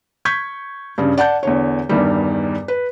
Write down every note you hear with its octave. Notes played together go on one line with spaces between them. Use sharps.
C#6 G6 G#6 B6
G2 C#3
D5 F#5 A5 G6
E2 D3 C#5
E2 G2 D#3 G3
B4